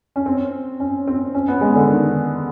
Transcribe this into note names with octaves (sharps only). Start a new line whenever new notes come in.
C#4
C4
C#4
C4
C#4
B3
G#3
D3
D#3